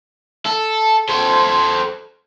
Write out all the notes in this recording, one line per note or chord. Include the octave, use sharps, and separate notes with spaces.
A4
A4 C5